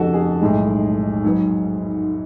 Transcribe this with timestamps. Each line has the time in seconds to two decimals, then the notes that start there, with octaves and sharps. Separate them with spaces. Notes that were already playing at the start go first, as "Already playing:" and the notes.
Already playing: F1 F2 C#3 F#4 A4
0.14 G#4
0.42 B1 A2 G#3
1.24 G#2 F#3 B3